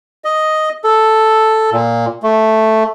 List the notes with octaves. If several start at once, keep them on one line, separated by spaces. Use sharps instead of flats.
D#5
A4
A#2
A3